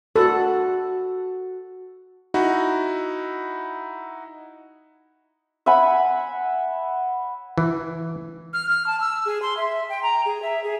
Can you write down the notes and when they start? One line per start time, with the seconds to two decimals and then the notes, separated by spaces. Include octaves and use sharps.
0.16 F#4 A4 F#5
2.34 D#4 E4 F#4
5.66 E5 F#5 G#5 B5
7.58 E3
8.53 F6
8.69 F6
8.87 A5
9.01 E6
9.25 G#4
9.42 C6
9.57 E5
9.90 G5
10.03 A#5
10.26 G#4
10.42 E5
10.64 G#4